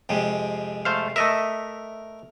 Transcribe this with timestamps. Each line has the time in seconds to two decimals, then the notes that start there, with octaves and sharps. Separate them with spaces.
0.09 F2 C3 G#3
0.85 A3 C5 F5
1.16 A3 A#4 D#5 E5